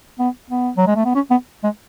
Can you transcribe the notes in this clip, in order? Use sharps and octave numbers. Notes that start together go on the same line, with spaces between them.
B3
B3
F#3
G#3
A3
B3
C#4
B3
G#3